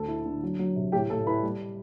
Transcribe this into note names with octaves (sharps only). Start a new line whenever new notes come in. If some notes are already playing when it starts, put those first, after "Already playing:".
Already playing: D2 A4 A5
E4
D3
F#3
F#3
C3
A2 G4 G5
A2 A4 A5
E4 B4 B5
G3